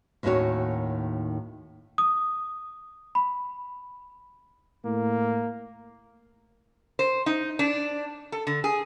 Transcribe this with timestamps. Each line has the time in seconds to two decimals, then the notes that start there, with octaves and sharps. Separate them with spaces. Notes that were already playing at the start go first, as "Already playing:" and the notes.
0.23 D#2 A2 D#3 C#4 F#4 C#5
1.98 D#6
3.15 B5
4.85 A2 A#3
6.99 C5
7.26 D#4
7.59 D4
8.32 A4
8.47 D3
8.64 G#4